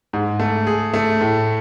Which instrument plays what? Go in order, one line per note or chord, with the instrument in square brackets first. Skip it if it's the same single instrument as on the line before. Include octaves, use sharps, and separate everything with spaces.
[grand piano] G#2
A3
G#4
A3
A2